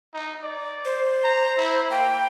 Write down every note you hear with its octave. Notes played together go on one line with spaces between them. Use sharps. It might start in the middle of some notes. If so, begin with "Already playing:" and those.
D#4
D5
C5
A#5
E4
A#3 G5